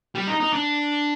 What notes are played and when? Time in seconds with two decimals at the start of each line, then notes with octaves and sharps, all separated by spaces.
0.15 G3
0.27 D#4
0.40 D#4
0.53 D4